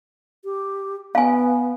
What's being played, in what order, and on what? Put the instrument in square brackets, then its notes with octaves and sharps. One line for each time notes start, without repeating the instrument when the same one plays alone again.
[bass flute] G4
[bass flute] B3 [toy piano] F5 G#5